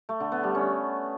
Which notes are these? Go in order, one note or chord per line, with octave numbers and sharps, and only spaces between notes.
A3
D3
B3
G3
C#4